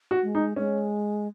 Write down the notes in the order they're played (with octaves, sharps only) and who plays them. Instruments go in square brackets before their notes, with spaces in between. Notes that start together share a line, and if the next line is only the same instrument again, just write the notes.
[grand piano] F#4
[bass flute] G#3
[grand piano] D#4
[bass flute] G#3 [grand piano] C#4